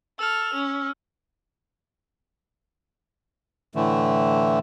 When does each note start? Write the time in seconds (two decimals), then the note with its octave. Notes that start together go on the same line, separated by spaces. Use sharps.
0.19 A4 E6 F6 F7
0.54 C#4
3.75 A2 D3 E3 A3